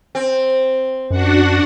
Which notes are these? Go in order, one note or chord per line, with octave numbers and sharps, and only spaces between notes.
C4
F#2 D4 F#4 F#5